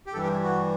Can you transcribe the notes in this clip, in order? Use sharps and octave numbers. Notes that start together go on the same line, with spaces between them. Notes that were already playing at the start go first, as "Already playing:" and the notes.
G4
G2 E3 G3 A4
G4
E4
F#4